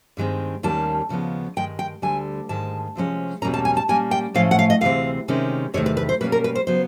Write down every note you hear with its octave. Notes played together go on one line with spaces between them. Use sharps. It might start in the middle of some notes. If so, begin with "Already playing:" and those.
G2 D#3 G#3 C4
D#2 D#3 G3 A#3 C#4 A5
D#2 C#3 F3 G#3 B3
G2 D#3 G#3 G5
G5
D2 D3 G3 G#5
G#2 D#3 G#3 A5
C3 F3 G#3 C#4
E2 B2 G3 A#3 C#4 A#5
A5
G#5
A5
A#2 G3 A#3 C#4 G#5
G5
A2 F3 A3 C#4 F5
F#5
F5
D#5
D2 C3 E3 G#3 C4 F5
C3 D#3 G#3 C#4
E2 C3 D#3 A3 C#5
B4
B4
C5
B2 G3 A#3 C#4 B4
A#4
B4
C5
C#3 F#3 B3 C5